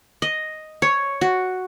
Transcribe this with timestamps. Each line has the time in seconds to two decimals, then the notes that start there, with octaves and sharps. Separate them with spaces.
0.22 D#5
0.82 C#5
1.21 F#4